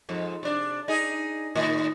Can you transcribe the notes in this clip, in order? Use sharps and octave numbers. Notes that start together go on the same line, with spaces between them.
F2 G#2
C3 D4
D#4 G#4
A2 D#3 D#4